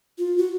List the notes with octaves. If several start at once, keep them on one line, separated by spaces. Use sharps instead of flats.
F4
F#4